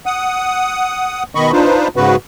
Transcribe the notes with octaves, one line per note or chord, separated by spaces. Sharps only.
F#5 D#6
B2 D#3 D#5 B5 C#6
D4 D#4 F4 B4 C5
G#2 C#3 B3 F#4 B4